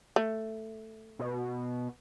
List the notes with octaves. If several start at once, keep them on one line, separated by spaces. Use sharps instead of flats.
A3
B2